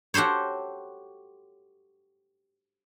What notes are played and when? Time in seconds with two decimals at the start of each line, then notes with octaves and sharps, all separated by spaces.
0.14 F#4 G4 A4 C5 C#5